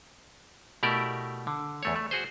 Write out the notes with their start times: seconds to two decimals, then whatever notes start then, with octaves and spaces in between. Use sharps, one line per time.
0.83 B2 A3 E4 G4 A#4 D5
1.47 D3
1.83 E2 A3 C#5
1.96 A3
2.11 F#4 G#4 C5